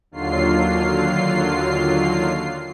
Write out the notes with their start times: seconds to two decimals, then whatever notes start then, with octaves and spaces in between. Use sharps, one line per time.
0.11 D#2 D3 F#3 F4 C7